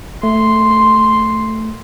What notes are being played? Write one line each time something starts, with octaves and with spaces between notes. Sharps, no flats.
A3 C6